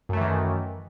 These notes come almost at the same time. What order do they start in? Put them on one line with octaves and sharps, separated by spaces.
F#2 A3 E3 D#3